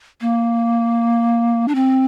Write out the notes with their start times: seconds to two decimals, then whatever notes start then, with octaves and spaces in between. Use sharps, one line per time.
0.21 A#3
1.68 D4
1.75 C4